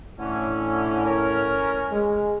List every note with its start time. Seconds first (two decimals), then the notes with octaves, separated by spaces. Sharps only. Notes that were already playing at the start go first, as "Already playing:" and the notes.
0.19 A2 D3 E3 C#4
1.04 C#4 A#4
1.92 G#3